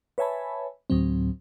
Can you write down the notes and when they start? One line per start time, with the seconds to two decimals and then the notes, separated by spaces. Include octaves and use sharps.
0.18 B4 C#5 E5 G#5 A5 B5
0.90 D2 A2 F#3 C4